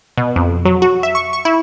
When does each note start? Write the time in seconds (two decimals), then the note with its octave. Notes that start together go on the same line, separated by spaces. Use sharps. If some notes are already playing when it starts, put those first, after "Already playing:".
0.17 B2
0.36 F2
0.65 F#3
0.82 F#4
1.03 E5
1.15 C#6
1.33 C#6
1.45 E4